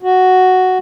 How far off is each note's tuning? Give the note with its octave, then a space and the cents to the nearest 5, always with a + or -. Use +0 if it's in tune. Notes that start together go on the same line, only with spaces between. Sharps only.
F#4 +0